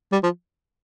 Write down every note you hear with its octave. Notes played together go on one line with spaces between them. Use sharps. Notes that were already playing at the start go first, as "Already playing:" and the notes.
G3
F3